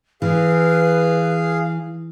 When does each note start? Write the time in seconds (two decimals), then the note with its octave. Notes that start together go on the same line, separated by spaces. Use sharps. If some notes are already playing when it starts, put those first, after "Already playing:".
0.22 E3 G#4 B4 F5